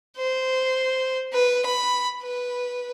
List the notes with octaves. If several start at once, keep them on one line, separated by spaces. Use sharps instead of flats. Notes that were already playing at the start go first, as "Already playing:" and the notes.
C5
B4
B5
B4